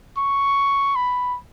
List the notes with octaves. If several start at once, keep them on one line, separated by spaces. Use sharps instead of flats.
C#6
B5